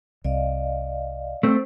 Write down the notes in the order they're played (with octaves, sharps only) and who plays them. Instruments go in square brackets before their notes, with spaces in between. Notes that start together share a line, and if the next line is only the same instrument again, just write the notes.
[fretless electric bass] C2 [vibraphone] D5 D#5 F5
[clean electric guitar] A3 C4 [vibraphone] C5